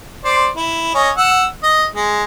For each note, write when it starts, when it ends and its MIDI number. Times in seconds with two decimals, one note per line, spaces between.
0.25 0.48 72
0.25 0.48 74
0.57 0.94 64
0.94 1.10 61
0.94 1.10 75
1.17 1.46 78
1.17 1.46 88
1.63 1.85 75
1.95 2.24 56